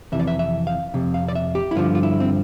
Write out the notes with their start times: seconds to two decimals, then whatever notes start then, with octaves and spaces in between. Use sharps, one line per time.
0.12 F2 C3 E3 E5
0.19 D5
0.27 E5
0.39 E5
0.67 F5
0.94 F2 C3
1.14 F5
1.29 D5
1.35 E5
1.55 G4
1.71 E4
1.75 G2 D3 F3 F4
1.95 F4
2.03 E4
2.20 C4